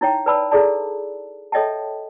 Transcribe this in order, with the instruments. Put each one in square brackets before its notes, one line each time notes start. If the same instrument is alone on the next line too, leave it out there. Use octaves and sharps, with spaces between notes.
[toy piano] D#4 E4 C#5 G5
B4 D5 A5 B5 E6
E4 G#4 A4 D5 A5
A4 C#5 D#5 E5 G5 A5